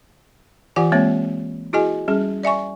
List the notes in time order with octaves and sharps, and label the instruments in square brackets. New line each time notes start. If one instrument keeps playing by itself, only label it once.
[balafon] E3 F4 G4 D5 F#5 G#5
G#3 A#3 C4 C#5
E4 F#4 G#4 D#5 G#5
G3 C#4 G#4
D5 E5 G#5 C#6